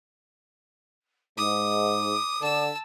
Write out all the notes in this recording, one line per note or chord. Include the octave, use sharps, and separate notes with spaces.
G#2 D6 D#6
D3 A5 E6